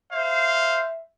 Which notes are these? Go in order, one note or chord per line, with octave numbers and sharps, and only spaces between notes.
C5 E5 F5